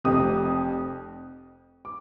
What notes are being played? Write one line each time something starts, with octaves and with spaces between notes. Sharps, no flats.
F1 F2 C3 D#6
D6